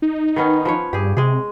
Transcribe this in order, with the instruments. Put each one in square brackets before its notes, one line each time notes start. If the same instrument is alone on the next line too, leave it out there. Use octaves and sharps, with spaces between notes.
[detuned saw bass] D#4
[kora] D#3 B3 C#4
F3 B4 C#5
[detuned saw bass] G2 [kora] G4 G#4
[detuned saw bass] C3 [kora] G#3 G#4